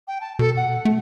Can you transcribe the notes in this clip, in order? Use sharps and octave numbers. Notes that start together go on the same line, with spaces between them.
G5
A5
B2 A4
F#5
A3